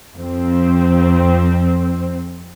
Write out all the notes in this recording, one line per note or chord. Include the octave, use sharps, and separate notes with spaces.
F2 C4